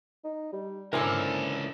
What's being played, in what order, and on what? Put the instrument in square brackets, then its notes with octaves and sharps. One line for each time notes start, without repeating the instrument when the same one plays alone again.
[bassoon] D#4
G3
[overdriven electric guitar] C#2 A4 [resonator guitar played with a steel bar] D3 D4 E4 [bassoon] C4 [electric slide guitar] A#4 G#5